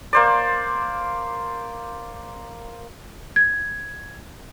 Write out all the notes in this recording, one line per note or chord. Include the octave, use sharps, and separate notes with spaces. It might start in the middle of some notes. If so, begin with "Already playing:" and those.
A#3 C5 D5
G#6